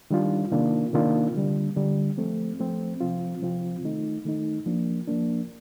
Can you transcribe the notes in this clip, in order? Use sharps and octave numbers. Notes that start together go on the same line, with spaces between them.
D#3 G3 D4 F4
C3 D#3 A#3 D4 F4
C3 D#3 A#3 D4 F4
D3 G3 D4
D3 G3 D4
F3 A3 C4
F3 A3 C4
C3 F3 C4 F4
C3 F3 C4 F4
D#3 A3 D#4
D#3 A3 D#4
F3 A#3 D4
F3 A#3 D4